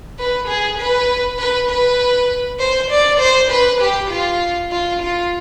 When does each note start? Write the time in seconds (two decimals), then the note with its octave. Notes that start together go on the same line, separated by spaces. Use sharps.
0.19 B4
0.48 G#4
0.79 B4
1.39 B4
1.69 B4
2.59 C5
2.91 D5
3.20 C5
3.51 B4
3.81 G4
4.10 F4
4.72 F4
5.02 F4